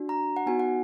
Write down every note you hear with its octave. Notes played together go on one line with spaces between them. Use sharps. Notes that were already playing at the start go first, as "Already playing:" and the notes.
Already playing: D4 F#4
A#5
F#5
B3 D#4 F#4 G#5
F#5